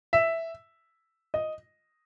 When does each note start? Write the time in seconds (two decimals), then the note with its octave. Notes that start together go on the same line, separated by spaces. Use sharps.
0.13 E5
1.34 D#5